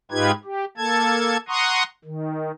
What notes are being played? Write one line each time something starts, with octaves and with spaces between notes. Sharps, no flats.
G#2 D#4 F4 G4 B4 G#6
G4
A#3 A4 A5 G#6
F#5 A#5 C6 C#6 D#6
D#3